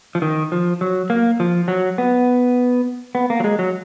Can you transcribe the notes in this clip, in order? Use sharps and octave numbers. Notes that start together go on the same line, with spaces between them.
F3
D#3
F3
F#3
A#3
F3
F#3
B3
B3
A#3
F#3
G#3
F#3